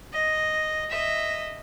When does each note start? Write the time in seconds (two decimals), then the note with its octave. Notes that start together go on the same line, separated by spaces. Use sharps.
0.13 D#5
0.90 D#5 E5